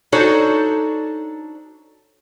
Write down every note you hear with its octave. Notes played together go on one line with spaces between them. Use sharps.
D4 D#4 F#4 A4 C5 C#5